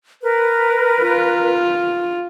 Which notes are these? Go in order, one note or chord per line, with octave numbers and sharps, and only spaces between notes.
A#4 B4
F4